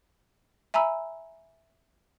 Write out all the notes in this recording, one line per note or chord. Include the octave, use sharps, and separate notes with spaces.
E5 G#5 A#5 B5 E6